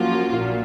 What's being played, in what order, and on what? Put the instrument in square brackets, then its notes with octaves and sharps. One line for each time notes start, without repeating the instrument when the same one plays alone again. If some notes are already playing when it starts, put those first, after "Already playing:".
Already playing: [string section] F#2 F3 A#3 F4 [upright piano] F#4
[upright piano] F#4
[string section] A#1 A#2 [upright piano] F4